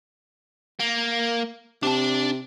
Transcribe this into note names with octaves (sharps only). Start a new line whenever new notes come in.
A#3
C3 D4 A5